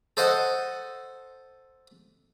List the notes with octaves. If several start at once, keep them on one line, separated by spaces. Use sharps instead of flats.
A4 C5 D#5 F#5